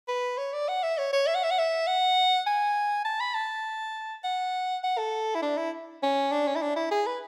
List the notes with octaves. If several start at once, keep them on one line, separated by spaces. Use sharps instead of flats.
B4
C#5
D5
F#5
E5
C#5
C#5
E5
F#5
E5
F#5
E5
F#5
G#5
A5
B5
A5
F#5
F#5
A4
E4
D4
E4
C#4
D4
C#4
E4
D4
E4
G#4
B4